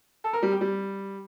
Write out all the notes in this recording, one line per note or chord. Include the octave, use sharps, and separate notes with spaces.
A4
A#4
G3
G4
G3